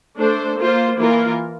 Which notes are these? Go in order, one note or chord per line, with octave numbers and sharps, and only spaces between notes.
A3 D4 A4 C5
A#3 F4 C5
E3 A#3 F4 A#4